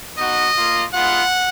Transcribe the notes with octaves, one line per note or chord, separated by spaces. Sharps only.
B3 D#4 F#4 D#5
A#3 F4
G#3 B3 F4 F#5